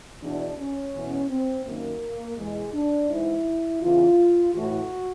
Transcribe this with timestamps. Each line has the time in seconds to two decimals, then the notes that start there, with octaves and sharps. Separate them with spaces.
0.22 E2 B2 D4
0.58 C#4
0.94 E2 B2
1.30 C4
1.66 F#2 D#3 A#3
2.37 E2 B2 G#3
2.73 D4
3.10 G#2 E3 E4
3.81 E2 C#3 E3 F4
4.53 A2 E3 F#4